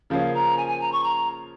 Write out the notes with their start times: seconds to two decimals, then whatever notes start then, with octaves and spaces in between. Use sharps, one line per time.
0.10 C#3 F3 A#3 C#4 F5
0.34 A#5
0.57 G#5
0.68 G#5
0.80 A#5
0.92 C#6
1.03 A#5